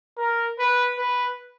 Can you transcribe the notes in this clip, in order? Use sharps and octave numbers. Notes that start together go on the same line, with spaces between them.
A#4
B4
B4